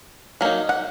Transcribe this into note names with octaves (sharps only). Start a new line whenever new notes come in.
F#3 A#3 D#4
F#5